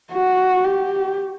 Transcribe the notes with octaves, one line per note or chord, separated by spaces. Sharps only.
F#4
G4